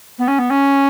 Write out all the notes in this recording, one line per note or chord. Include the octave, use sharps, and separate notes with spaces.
B3
C#4
B3
C#4